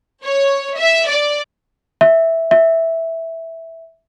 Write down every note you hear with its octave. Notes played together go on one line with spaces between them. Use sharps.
C#5
E5
D5
E5
E5